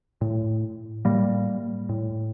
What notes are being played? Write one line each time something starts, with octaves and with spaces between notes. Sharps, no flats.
A2
A2 G3 A#3
A2